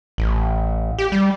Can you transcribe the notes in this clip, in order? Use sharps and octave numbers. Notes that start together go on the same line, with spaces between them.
A1
G4
G3